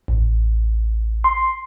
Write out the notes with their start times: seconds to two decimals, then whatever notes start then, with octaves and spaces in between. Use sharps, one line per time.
0.08 A1
1.24 C6